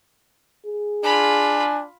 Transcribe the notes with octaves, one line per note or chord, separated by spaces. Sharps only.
G#4
D4 F4 G#5 B5